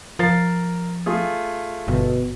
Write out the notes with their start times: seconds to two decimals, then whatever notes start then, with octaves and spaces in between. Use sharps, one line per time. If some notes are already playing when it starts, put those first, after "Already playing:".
0.19 F3 A#4 A6 C7
1.06 A3 F4 G#4
1.88 G1 B2